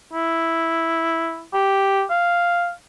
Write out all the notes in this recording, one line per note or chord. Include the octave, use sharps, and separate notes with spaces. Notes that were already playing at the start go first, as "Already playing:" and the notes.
E4
G4
F5